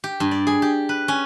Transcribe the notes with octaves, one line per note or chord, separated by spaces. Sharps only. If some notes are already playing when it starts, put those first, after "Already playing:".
G4
G2
D5
G#4
G4
B4
C#4